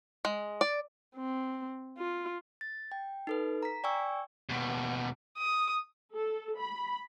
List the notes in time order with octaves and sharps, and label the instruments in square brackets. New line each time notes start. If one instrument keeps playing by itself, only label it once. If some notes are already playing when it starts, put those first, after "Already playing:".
[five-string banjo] G#3
D5
[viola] C4
F4
[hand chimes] A6
G5
D#4 A4 B4
A#5 B6
D5 G5 G#5 C#6 E6
[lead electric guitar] D#2 B2
[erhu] D#6
[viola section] A4
B5